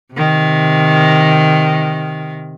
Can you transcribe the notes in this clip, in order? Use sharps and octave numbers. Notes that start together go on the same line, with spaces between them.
C3 D#3